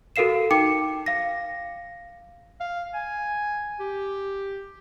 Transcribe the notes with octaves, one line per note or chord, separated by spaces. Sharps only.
F#4 A4 A#4 F5 C7 E7
D#4 G5 D6 C#7
F5 A#6
F5
G#5
G4